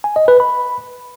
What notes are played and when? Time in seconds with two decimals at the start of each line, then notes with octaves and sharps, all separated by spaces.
0.04 G#5
0.16 D#5
0.28 B4
0.40 B5